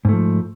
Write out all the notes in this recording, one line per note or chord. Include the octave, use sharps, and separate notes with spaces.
G#2 F3 A3